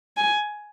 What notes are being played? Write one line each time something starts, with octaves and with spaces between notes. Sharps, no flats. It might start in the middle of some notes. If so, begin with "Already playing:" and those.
G#5